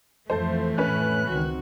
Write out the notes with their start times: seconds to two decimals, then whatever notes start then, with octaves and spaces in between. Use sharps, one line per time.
0.30 F2 A2 E3 F3 A3 A4 C5
0.78 F2 A2 C#4 B4 F#6
1.28 C#2 D#3 C4 F#4